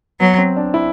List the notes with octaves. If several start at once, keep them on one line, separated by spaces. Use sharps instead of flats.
F#3 B3
C4
D4
E4